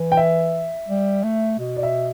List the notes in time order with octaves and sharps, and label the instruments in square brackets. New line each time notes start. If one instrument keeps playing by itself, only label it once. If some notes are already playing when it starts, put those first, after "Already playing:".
Already playing: [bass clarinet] E3
[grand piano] G5
E5
[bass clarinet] G3
A3
B2
[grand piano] D5
E5